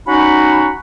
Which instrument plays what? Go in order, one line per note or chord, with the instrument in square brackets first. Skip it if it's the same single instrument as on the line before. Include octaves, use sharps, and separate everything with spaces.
[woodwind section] C#4 D#4 F#4 F#5 B5